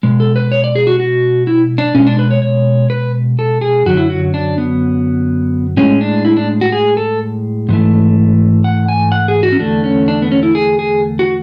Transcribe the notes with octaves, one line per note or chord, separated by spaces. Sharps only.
B2 G#3
A4
B4
C#5
D5
G#4
F#4
F#4
E4
D4
B2 G#3 C#4
D4
B4
C#5
C#5
B4
A4
G#4
F#2 D3 F#3 F#4
E4
F#4
D4
B3
A2 G#3 C#4
D4
E4
D4
F#4
G#4
A4
G#2 E3 A3
F#5
G#5
F#5
G#4
F#4
C#4
E2 D3 A3 D4
C#4
D4
B3
C#4
E4
G#4
G#4
F#4